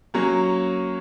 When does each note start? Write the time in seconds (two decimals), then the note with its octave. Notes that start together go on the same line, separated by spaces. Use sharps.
0.14 F#3 A#3 C#4